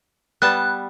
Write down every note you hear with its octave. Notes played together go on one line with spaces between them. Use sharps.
G3 B3 A5 F#6